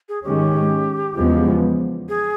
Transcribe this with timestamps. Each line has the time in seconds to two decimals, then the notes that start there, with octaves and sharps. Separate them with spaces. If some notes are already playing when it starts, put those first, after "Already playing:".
0.09 G#4
0.24 G#2 D#3 G#3 C#4 G4
1.16 E2 C#3 F3 G#3 B3
2.09 G#4